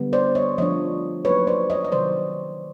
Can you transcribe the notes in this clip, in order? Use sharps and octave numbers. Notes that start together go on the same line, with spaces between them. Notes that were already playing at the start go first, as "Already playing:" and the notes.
Already playing: D3 G3 B3
C5 D5
C#5 D#5
F3 A3 D4 C#5 D#5
F#3 A#3 D#4 B4 C#5
C5 D5
C#5 D#5
D#5
C3 D#3 F#3 C5 D5